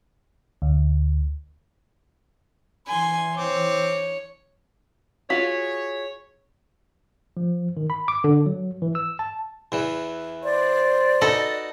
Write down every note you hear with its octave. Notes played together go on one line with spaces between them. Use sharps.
D2
E3 G#5 C6
C4 C#5 D6
F4 F#4 G#4 C#5 B6
F3
D#3
B5
D6
D3
F#3
E3
E6
A5
E2 E3
C5 D5
D#4 F#4 A4 B4